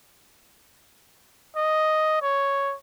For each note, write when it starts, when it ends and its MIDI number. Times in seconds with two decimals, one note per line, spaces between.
1.56 2.19 75
2.22 2.75 73